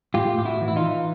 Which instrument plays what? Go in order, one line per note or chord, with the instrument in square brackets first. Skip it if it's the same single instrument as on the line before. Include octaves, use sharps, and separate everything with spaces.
[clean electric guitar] A2 F4 G4
A2 G4
E4 F#4
E3
E4
D#4 F4
E3